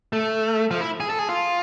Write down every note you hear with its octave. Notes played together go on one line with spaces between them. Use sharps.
A3
F3
E4
G#4
A4
G#4
F4